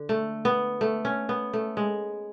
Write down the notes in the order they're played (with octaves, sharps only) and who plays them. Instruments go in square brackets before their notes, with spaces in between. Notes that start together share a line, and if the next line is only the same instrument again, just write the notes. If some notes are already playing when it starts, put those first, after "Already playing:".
Already playing: [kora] D3
A3
B3
A3
C#4
B3
A3
G#3